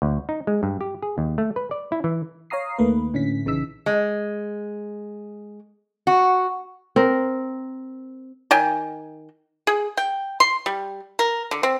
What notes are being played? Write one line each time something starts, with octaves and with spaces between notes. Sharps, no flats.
D2
D#4
G#3
G2
G4
G#4
D#2
A3
B4
D5
E4
E3
C#5 F5 A#5 D#6 C7
D#2 D#3 A3 A#3 B4
A2 D3 C#4 E4 B6
A#1 C#3 E3 D#4 E6 B6
G#3
F#4
C4 A#4
D#3 G5 G#5
G#4
G5
C6
G3
A#4
D3
C4